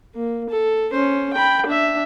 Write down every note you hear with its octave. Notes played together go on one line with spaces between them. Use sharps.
A#3
A4
C#4 C5
G5 B5
D4 E5